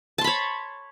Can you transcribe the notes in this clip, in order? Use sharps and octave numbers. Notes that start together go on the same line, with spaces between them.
C#5 A5 B5 C6